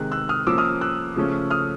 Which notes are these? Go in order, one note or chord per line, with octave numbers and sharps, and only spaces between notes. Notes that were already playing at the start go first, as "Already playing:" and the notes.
Already playing: C3 D#3 G#3 F#6
E6 F#6
D#6 F6
F3 A#3 C#4 D6 E6
D#6 F6
E6 F#6
C#3 F3 A3 C#4
D#6 F6